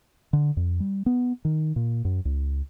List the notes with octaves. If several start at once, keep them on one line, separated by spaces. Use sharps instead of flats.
D3
F2
G3
B3
D#3
A#2
F#2
C#2